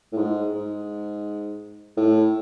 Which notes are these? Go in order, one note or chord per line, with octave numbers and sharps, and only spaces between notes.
A2
G#2
G#2
A2